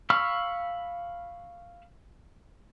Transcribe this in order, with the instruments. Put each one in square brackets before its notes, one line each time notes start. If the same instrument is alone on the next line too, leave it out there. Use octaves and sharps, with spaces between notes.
[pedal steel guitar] F5 B5 C#6 E6 F6